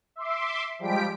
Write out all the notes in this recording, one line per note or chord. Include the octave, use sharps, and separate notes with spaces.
E5 C6 D6
F3 G3 G#3 G4 B6 D7